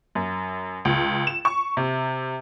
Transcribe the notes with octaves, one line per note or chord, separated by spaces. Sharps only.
F#2
C#2
E7
C#6
C3